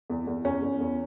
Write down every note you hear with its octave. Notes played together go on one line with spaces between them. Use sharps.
E2
E2
E2 C#4
E2
E2